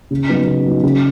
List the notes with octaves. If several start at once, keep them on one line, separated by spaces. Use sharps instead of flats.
C#3
F#3 B3 D#4
C#3
F#3 B3 D#4
C#3